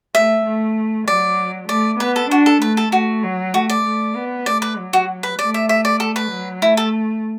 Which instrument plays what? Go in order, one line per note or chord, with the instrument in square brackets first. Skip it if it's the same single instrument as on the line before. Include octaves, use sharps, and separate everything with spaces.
[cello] A3 [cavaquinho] E5
[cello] A3
[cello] F#3 [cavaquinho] D5
[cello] A3 [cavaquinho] D5
[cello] B3 [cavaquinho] B4
[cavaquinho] A4
[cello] D4 [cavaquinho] F#4
[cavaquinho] A4
[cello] A3 [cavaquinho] B4
[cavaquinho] A4
[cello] A3 [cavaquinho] F#4
[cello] F#3
[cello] A3 [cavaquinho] F#4
[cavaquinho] D5
[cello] A3
B3
[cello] A3 [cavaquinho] D5
[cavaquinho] B4
[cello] F#3
[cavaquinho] F#4
B4
[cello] A3 [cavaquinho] D5
[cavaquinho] E5
E5
D5
A4
B4
[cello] F#3
[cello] A3 [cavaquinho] E4
[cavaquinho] A4